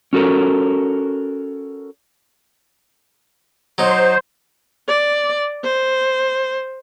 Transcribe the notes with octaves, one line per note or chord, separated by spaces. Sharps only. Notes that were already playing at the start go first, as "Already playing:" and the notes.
C#4 F#4 A4 A#4
F#3 D#4 C5
D5
C5